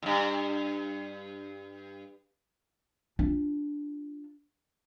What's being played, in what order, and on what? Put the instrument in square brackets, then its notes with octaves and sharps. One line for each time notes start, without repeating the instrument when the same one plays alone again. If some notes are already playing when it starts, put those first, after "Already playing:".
[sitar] E2 G2
[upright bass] D4 F4